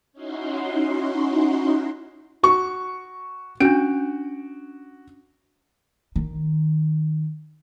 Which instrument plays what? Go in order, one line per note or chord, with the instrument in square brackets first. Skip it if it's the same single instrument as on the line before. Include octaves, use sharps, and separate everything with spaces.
[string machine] C#4 D#4 E4 F#4 C6
[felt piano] F#4 C#6
[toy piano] C#4 D4 [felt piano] F#4 D7
[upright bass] D#3